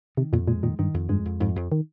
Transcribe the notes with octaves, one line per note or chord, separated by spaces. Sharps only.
C3 D#3
F2 A#2
A#2 G#3
A#2 D#3
G2 D#3
F2
G2 G#3
F2
F2 G#2
F2
D#3